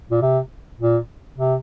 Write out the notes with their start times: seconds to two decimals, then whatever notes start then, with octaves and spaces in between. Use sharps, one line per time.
0.11 A#2
0.22 C3
0.80 A#2
1.38 C3